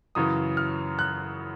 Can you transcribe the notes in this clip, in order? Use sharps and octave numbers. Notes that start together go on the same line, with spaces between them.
F#2 C#3 E3 D#6
F6
F#6